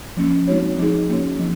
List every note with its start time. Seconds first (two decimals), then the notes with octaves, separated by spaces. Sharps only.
0.17 F3 A#3 C#4
0.48 G#3 C4 D#4 F#4 C#5
0.78 F3 G#3 D#4 G#4
1.09 A#3 C#4 F#4 C#5
1.39 F3 C4 D#4